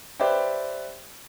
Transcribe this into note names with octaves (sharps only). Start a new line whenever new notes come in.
G4 B4 C5 D5 E5 G5